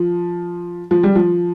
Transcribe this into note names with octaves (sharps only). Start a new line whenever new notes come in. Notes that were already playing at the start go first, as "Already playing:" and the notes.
Already playing: F3
F3
G3
F3